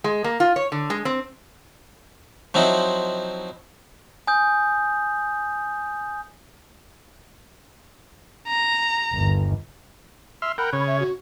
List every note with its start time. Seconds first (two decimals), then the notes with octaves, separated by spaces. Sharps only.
0.04 G#3
0.24 A#3
0.40 F4
0.56 C#5
0.72 D3
0.90 G#3
1.05 C4
2.54 F3 F#3 C4 D#4 E4
4.27 G#5 D#6 G6
8.48 A#5
9.13 G1 D#2
10.42 E5 C6 F6
10.58 A#4 F#5 G5 B5
10.73 C#3 C#5
10.87 E5
11.00 F#4